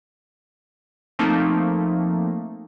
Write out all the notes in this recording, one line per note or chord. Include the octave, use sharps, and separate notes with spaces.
F3 A3 A#3 C4 D#4